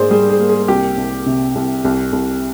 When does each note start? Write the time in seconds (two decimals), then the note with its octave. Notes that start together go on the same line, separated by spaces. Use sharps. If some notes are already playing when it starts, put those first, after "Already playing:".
Already playing: G#2 A#3 G#4 C5 D5
0.10 G3 G#4
0.30 G#4
0.40 A#3
0.49 G#4
0.68 C2 G4
0.98 C2
1.26 C3
1.55 C2
1.84 C2
2.13 C2